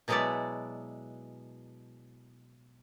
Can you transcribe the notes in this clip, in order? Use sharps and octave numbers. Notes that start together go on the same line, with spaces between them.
B2 F#3 G#3 B3 E4 D5